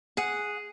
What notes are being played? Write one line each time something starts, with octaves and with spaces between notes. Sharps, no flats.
G#4 F#5